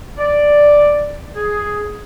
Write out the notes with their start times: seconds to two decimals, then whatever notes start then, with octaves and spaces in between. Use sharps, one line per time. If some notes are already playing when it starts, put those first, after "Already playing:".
0.18 D5
1.35 G#4